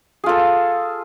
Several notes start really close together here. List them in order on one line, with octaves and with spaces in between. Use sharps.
G#4 F4 A4